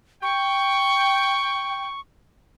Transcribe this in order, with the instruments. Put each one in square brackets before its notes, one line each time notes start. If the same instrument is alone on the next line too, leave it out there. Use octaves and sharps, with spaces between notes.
[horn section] G5 [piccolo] C#6